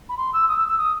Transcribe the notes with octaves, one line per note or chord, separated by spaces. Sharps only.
B5
C6
E6
D#6
E6
E6
D#6